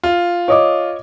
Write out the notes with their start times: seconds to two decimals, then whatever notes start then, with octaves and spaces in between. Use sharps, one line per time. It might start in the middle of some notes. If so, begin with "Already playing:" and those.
0.04 F4
0.48 C#5 D#5 D6